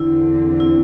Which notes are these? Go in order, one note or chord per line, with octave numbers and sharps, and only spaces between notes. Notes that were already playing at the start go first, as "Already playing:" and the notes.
Already playing: E2 D3 C4 E4
E4